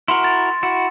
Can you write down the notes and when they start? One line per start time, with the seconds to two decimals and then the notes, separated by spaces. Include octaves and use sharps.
0.08 E4 F#4 A#4 C6
0.24 A6
0.63 E4 F#4